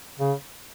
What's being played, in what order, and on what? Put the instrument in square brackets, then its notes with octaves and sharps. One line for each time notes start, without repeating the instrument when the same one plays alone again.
[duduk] C#3